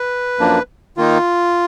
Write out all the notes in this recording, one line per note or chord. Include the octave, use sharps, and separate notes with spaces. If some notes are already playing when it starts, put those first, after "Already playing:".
Already playing: B4
F#2 F3 A#3 D4
D#3 A#3 D#4 F4